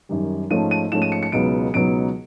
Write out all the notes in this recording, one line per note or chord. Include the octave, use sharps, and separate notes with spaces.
F#2 D#3 G3
G#2 F3 A3 C#4 D#7
D#7
G#2 F3 A3 C#4 E7
D#7
C#7
C#7
C#2 B2 F#3 B3 D#4 D7
C#2 B2 F#3 B3 D#4 D7